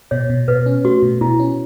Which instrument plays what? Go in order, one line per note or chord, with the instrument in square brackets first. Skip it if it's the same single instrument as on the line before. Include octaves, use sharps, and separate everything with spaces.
[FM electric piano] B2 [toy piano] C#5
[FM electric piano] B2
[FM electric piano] B2 [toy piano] B4
[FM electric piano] C#4
[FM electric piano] A3 [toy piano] F#4
[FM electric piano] B2
[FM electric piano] B2 [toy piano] E4
[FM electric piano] C#4